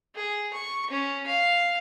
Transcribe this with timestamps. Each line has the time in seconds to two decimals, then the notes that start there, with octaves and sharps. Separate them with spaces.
0.15 G#4
0.54 C#6
0.91 C#4
1.27 F5